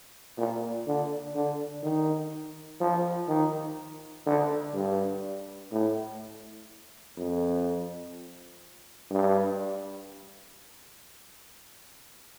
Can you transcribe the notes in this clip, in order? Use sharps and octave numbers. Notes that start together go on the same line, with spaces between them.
A#2
D3
D3
D#3
F3
D#3
D3
G2
A2
F2
G2